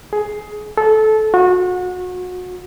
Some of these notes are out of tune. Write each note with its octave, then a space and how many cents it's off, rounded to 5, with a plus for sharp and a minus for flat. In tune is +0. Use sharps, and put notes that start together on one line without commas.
G#4 +15
A4 -20
F#4 -30